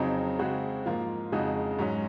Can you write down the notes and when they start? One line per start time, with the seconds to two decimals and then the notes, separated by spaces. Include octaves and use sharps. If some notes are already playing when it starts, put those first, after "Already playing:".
Already playing: F2 C#3 F#3 C4 D#4
0.39 C#3 G#3 C4 F#4
0.86 G#2 F3 A#3 F4
1.32 F2 C#3 G#3 D#4 F#4
1.79 G#2 F#3 C#4